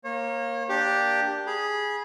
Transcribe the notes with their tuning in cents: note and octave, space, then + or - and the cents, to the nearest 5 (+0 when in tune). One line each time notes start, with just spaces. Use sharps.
A#3 +0 C#5 -35
A#3 +0 D4 +0 G4 +0
G#4 +0 B5 -30